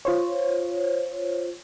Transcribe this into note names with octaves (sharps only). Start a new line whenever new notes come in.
F4 C5 C#5